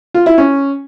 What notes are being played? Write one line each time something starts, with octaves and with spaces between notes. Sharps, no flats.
F4
E4
C#4